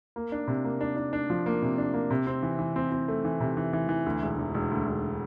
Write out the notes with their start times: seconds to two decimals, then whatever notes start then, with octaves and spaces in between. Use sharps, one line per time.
0.16 A#3
0.32 D4
0.48 C3
0.64 A#3
0.81 D4
0.96 D4
1.13 D4
1.30 F3
1.46 A#3
1.62 C3
1.78 D4
1.94 A#3
2.11 C3
2.27 C4
2.43 E3
2.59 E3
2.76 C4
2.92 C4
3.08 A3
3.25 E3
3.40 C3
3.57 E3
3.73 E3
3.89 E3
4.06 D2
4.22 E1
4.39 E1
4.54 E1
4.71 D2
4.87 E1